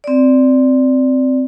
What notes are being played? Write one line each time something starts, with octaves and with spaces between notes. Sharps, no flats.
C4 D5